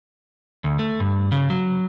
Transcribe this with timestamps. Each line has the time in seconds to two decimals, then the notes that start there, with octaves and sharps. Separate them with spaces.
0.64 D2
0.79 A3
1.00 G2
1.32 C#3
1.50 F#3